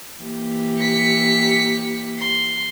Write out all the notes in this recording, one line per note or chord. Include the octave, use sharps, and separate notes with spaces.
E3 A#3 G4
B6 C#7
C6